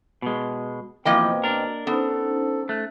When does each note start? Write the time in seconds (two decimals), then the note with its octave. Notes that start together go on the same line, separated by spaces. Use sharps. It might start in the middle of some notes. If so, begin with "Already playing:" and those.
0.22 B2 G#3
1.05 B2 E3 F3 A#3 C4 D#5 G5
1.44 D4 A#4
1.87 B3 C#4 D#4 A4 C5
2.69 A3 F#6